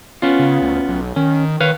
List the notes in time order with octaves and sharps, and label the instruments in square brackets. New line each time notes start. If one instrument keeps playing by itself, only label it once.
[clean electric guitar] B3 C#4 F4
[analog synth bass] C#3
D2
B1
[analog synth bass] D#3 [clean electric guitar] C#4
[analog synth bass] D#3 [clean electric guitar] B4 C#5 F5